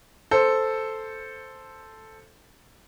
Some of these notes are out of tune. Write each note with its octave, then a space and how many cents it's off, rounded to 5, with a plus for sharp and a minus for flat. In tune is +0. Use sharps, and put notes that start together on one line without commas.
A4 +0 C5 +0